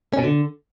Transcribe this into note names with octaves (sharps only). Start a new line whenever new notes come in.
C#4
B2
D3